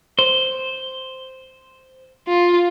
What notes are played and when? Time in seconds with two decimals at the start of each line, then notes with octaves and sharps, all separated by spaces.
0.19 C5
2.28 F4